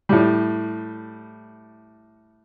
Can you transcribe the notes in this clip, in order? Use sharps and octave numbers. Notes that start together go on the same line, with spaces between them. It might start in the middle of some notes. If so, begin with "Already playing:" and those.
A2 G3